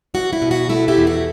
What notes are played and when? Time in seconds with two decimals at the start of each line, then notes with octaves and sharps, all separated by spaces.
0.14 E2 F#4
0.33 E4
0.42 B2
0.51 F#4
0.69 A3 E4
0.88 E4 G4
0.97 E2
1.07 F#4